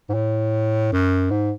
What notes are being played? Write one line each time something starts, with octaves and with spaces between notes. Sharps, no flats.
G#2
A2
F#2
G#2